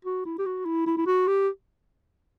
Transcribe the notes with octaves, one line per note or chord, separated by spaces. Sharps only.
F#4
E4
G4
F#4
E4
E4
E4
F#4
G4